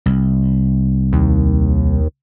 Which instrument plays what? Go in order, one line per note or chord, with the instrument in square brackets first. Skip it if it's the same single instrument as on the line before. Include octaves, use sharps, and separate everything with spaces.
[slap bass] C2
[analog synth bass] D#2